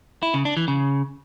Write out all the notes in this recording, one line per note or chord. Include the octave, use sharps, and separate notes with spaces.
E4
C#3
D4
E3
C#3